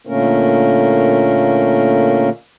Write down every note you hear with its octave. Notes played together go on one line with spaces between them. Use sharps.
A#2 D3 A3 A#3 C#4 A#4